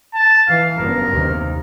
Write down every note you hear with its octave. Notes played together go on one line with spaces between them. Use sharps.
A5
E3 F5
F#1 G2 B3 A#4
D#2 C3